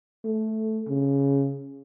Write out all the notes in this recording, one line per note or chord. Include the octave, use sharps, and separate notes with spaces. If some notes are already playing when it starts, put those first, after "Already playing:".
A3
C#3